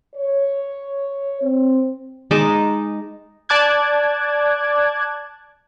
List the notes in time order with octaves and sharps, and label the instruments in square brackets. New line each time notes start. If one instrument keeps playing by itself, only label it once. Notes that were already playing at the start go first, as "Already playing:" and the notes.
[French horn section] C#5
C4
[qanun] G#3 D#4 A5 D6
[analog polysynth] D5 A5 D6 F#6 G#6